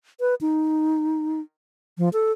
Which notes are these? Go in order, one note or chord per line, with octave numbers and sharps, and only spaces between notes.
B4
D#4
F3
A4